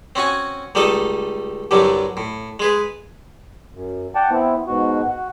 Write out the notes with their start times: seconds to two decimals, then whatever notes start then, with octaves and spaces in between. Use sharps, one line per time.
0.15 C4 C#4 F#4 G#5
0.75 C#2 G3 A3 D#4 A4 D#5
1.71 C2 G2 D3 F#3 G3
2.17 A2
2.60 G#3 G#4 B4
3.75 F#2
4.15 D5 F#5 G5 A5
4.30 B3 C4 E4
4.67 G#2 B2 F#4
5.08 F#4